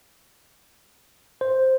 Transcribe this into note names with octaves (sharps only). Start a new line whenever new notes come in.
C5